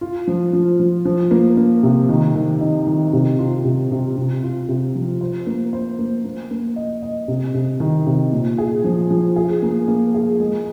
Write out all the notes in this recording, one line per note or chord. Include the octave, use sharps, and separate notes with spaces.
F4
F3
F3
F3
F3
A#3
A#3
C3
D#3
D#3
D#4
D#3
C3
F4
C3
C3
C3
F4
C3
F3
C5
A#3
C5
A#3
A#3
A#3
D#5
D#5
C3
C3
D#3
C3
A#2
G#4
F3
F3
G#4
A#3
A#3
G#4
G#3